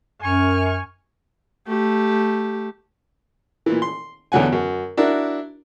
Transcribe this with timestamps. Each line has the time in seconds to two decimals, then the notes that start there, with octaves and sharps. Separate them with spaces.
0.22 F#2 G#5 C#6 F6
1.68 A3 G4
3.66 A#2 E3
3.82 C6
4.32 E2 D3 F#3 F#5 G#5
4.52 F#2
4.97 D4 E4 F#4 A#4